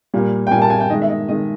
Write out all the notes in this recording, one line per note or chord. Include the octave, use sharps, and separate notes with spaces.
A#2 G3 A#3
G5
A#2 G3 A#3 G#5
A5
G#5
G5
D#3 G#3 D#5
E5
D#5
D#3 G#3 D#5